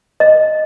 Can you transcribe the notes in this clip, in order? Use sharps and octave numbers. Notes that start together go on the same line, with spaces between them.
D#5